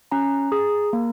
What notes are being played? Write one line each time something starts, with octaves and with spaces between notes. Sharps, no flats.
C#4 A#5
G#4
A#3